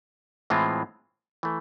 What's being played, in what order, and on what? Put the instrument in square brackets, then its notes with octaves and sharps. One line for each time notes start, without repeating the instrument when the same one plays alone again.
[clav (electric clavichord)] A2 E3 G#3 C4 F4
E3 A3